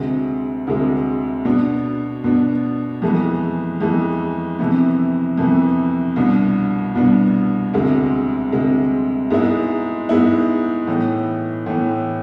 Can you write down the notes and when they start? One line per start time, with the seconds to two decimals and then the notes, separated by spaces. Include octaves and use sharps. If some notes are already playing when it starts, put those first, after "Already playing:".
Already playing: D2 C3 G#3
0.67 D2 C3 G#3
1.45 B2 B3 D4
2.24 B2 B3 D4
3.02 F2 E3 G#3 B3
3.81 F2 E3 G#3 B3
4.59 F2 C3 E3 B3
5.38 F2 C3 E3 B3
6.16 C2 B2 B3 D4
6.95 C2 B2 B3 D4
7.74 D2 C3 G#3
8.52 D2 C3 G#3
9.31 G#2 G#3 B3 E4
10.09 G#2 G#3 B3 E4
10.87 A2 E3 B3
11.66 A2 E3 B3